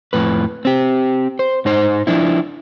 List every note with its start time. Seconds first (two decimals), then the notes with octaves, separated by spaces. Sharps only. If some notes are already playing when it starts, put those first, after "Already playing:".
0.13 F2 A2 B4
0.65 C4 G4
1.39 C5
1.65 G#2 D#4 C5
2.07 F3 D4 E4